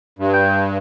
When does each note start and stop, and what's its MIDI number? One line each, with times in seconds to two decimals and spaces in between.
0.19 0.78 43
0.34 0.61 79